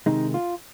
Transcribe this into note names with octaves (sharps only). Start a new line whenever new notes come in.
C3 D#3 G#3 D#4
F4